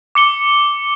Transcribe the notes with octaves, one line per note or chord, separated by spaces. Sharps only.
D6 C#7 G7